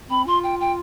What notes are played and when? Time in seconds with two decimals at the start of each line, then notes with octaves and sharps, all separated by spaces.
0.10 C4 B5
0.26 F4 C6
0.43 G5
0.60 G5